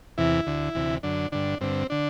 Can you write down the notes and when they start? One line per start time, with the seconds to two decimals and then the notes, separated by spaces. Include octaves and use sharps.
0.18 E2 C3 E3 E4
0.46 D2 D3
0.75 D2 C3 E3
1.03 F#2 D3 D4
1.32 G2 D3 D4
1.61 G2 D3 C4
1.90 D3 D4